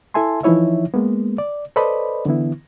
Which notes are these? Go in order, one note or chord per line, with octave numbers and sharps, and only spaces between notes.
E4 A4 E5 G#5 A5 C6
E3 F3 D#4 E4 C#5 E5
G#3 A#3 B3
D5
A4 B4 C5 D5 D#5 B5
D3 E3 B3 E4